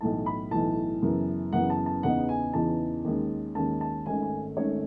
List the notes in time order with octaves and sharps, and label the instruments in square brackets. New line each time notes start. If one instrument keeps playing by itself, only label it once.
[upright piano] B1 A2 E3 A5
B5
B1 A2 E3 A5
F#2 C#3 E3 B3
F#2 C#3 E3 B3 F#5
A5
A5
E2 C#3 E3 B3 D#4 F#5
G#5
E2 C#3 E3 B3 D#4 A5
D#2 D#3 G#3 C#4
D#2 D#3 G#3 C#4 A5
A5
G#1 G#2 D#3 A3 C#4 G#5
G#5
G#1 G#2 D#3 A3 C#4 C#5